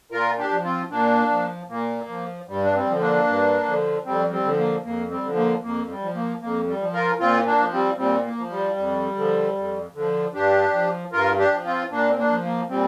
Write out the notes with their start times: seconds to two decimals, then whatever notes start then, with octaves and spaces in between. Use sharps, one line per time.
0.11 A#2 F4 A#4
0.38 D4 G4
0.51 F3
0.64 C4 F4
0.90 A#2 A#3 D4
1.30 F3
1.69 A#2 A#3
2.09 F3
2.48 G2 G3
2.63 D4
2.74 G3 C4
2.87 D3 F3
3.00 A#3 D4
3.26 G2
3.66 D3 F3
4.05 F2 G3 C4
4.31 G3 C4
4.44 D3 F3
4.57 A#3
4.84 F2 A#3
5.10 G3 C4
5.22 D3 F3
5.36 A#3
5.62 F2 A#3
5.89 G3
6.02 F3
6.15 A#3
6.41 F2 A#3
6.67 G3
6.80 F3
6.93 F4 A#4
7.20 A#2 C4 F4
7.45 A#3 D4
7.59 F3
7.72 G3 C4
7.98 A#2 G3 C4
8.24 A#3
8.38 F3
8.50 G3
8.76 F2
9.16 D3 F3
9.55 F2
9.94 D3 F3
10.34 G2 D4 G4
10.73 F3
11.12 G2 F4 A#4
11.38 D4 G4
11.52 F3
11.65 C4 F4
11.91 A#2 A#3 D4
12.09 C4
12.17 A#3 D4
12.30 F3
12.43 A#3
12.69 A#2 G3 C4